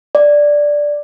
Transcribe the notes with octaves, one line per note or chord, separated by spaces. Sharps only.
D5